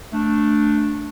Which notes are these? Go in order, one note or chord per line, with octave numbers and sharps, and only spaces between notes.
A3 D4